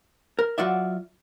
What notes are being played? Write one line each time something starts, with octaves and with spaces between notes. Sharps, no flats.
A#4
F#3 F4 F#4 D5 E5